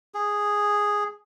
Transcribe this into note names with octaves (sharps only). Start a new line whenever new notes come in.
G#4